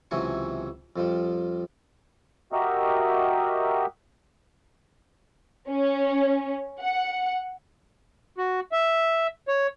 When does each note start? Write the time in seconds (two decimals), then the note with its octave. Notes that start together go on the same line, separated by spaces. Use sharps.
0.11 C#2 C3 E3 F#3 G#5 C#6
0.96 F2 F3 G3
2.52 F#4 G4 A#4 D#5 E5
5.69 C#4
6.80 F#5
8.38 F#4
8.72 E5
9.48 C#5